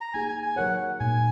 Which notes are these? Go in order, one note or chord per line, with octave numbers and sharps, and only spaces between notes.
A#5
A#3 D#4 G#4 G#5
G#5
G#5
F#3 D#4 A#4 C#5 F#5
A#2 G#3 D#4 G#5